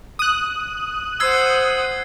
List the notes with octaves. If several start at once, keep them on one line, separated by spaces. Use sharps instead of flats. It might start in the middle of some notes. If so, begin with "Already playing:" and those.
D#6 F#6
C5 F#5 E6 G#6 C7